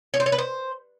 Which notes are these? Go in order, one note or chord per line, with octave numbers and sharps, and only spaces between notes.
C#5
C5
C#5
B4
C5